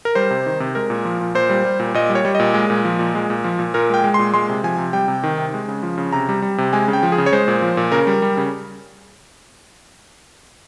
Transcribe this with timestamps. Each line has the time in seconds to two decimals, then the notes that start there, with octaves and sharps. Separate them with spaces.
0.05 A#4
0.15 G3 C5
0.30 C3
0.46 D#3
0.60 C3
0.75 G#3 A#4
0.90 A#2
1.05 F3
1.21 A#2
1.35 A#2 C5
1.50 G3
1.65 G3
1.80 A#2
1.94 A#2 D#5
2.10 G3
2.15 C#5
2.25 G3
2.35 A#2 D#5
2.54 G#3
2.70 A#2
2.85 F3
2.99 A#2
3.15 G#3
3.30 A#2
3.44 F3
3.59 A#2
3.74 A#2 A#4
3.90 G#3 G5
4.04 G#3
4.14 A#2 C6
4.34 G#3 C6
4.49 C3
4.64 F3 G#5
4.78 C3
4.93 G3 G5
5.08 C3
5.23 D#3
5.38 C3
5.54 G#3
5.68 C#3
5.83 F3
5.98 C#3
6.13 C3 A#5
6.29 G3
6.42 G3
6.58 C3
6.73 G#3 G#5
6.88 C#3
6.93 G5
7.03 F3
7.12 G#4
7.18 C#3
7.26 C#5
7.32 G#3 C5
7.48 A#2
7.62 F3
7.77 A#2
7.92 C#3 A#4
8.07 G3
8.22 G3
8.37 C#3